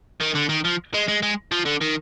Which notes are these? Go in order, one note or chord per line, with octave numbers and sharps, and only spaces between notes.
D#3
D3
D#3
F3
G#3
G#3
G#3
F3
D3
D#3